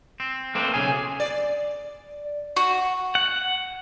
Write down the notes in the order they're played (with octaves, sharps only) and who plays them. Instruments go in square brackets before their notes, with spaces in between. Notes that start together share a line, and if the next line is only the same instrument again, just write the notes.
[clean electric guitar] C4
[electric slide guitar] A3 B4 [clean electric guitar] A#3 C4
[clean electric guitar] B1 C#3 G#4 [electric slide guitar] G#5
[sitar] D5
[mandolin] F#4
[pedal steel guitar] F#5